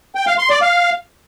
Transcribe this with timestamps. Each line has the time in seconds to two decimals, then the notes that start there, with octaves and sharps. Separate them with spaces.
0.15 G5
0.27 F5
0.38 C6
0.50 D5
0.61 F5